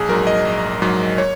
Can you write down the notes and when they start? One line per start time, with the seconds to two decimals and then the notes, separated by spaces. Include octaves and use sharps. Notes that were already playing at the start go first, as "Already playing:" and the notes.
Already playing: A#1 G#4
0.09 G#2 F#3 A#4
0.27 D#5
0.45 A#1
0.82 G#2 F#3
1.18 C#5